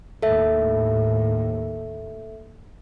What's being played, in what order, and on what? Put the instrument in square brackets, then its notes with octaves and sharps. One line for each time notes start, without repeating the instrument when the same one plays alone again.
[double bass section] D#2 A2 [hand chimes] A4 E5